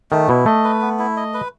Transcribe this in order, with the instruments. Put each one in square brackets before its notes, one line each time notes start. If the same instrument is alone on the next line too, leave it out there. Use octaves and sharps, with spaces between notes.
[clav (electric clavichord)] D#3 [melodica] A3
[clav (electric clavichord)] B2 [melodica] E4
[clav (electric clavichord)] A3 [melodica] D#5
[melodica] B4
B3
E4
D#5
B4